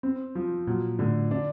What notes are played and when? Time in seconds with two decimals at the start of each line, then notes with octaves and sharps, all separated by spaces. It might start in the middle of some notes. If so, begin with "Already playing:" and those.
0.03 C4
0.35 F3
0.67 A#2 F#3
0.99 A2 D3
1.31 D4